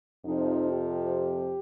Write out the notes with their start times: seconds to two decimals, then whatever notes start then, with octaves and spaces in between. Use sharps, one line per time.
0.24 F2 C3 F3 D#4
0.71 G4